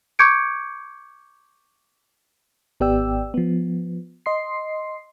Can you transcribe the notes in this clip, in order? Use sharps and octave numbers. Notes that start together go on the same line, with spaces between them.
C#6 D6 G6 G#6 C#7 D7
G#1 B3 G4 D5 G5 E6
F3 B3
D#5 C6 C7